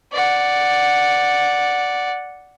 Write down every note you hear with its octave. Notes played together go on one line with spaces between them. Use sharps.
D5 F#5